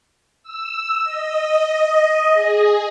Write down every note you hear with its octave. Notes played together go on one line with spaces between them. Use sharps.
E6
D#5
G#4